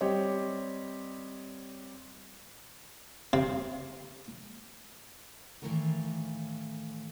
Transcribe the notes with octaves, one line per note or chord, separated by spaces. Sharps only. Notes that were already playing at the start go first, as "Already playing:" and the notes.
G3 C4 G4 C#5 D#5
C3
A2 D#3 E3 A3 A#4 F5